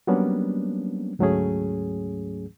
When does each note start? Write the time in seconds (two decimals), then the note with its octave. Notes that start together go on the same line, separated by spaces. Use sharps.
0.07 F#3 G3 A#3 B3 C#4 D4
1.19 D2 G#2 F#3 A3 C#4 G#4